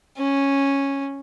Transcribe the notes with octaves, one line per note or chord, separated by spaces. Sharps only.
C#4